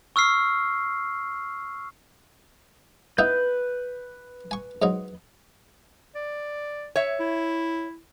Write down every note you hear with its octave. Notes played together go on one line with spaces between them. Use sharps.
C#6 E6 F6 C7
B3 D#4 E4 B4 G6
G#5 C#6
G#2 F#3 D#4
D5
C#5 E5
E4